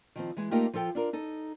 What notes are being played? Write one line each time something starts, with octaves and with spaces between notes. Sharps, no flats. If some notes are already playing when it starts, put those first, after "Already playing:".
D#3 F3 C4
E3 G#3
A3 A#3 D#4 F4 G4 G5
F3 F4 A4 G5
D4 F4 A#4
D#4 A4